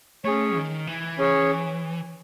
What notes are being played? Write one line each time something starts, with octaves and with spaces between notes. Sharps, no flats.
A3 C#4 G#4 C#5
D#3
E3
C#4 G#4 C#5